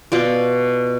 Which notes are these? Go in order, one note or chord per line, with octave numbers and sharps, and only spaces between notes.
B2 F4 D5